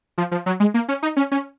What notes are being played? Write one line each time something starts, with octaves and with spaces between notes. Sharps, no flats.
F3
F3
F#3
G#3
A#3
C#4
D#4
C#4
C#4